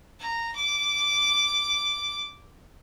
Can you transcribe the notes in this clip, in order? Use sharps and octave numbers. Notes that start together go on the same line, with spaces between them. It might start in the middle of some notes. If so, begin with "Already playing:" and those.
A#5
D6